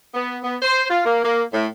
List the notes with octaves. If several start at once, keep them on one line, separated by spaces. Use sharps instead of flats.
B3
B3
C5
F4
A#3
A#3
A2